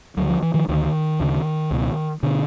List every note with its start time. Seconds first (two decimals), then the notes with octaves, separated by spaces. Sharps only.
0.17 D2 D3 F#3
0.29 F3
0.43 E3
0.54 D#3 F3
0.68 D2 D3 D#3
1.20 D2 C#3
1.71 C#2 B2
2.23 B2 D3